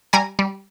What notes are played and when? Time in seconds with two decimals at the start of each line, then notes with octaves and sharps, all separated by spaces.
0.13 G3 G#5 A#5
0.39 G3